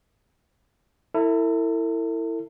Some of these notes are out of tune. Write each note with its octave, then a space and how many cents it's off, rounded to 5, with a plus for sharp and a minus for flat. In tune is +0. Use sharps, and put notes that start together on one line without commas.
E4 +0 A4 +45